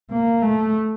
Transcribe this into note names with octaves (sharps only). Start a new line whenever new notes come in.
A#3
A3